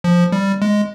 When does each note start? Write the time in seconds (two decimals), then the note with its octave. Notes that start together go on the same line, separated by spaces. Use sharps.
0.04 F3
0.32 G3
0.62 G#3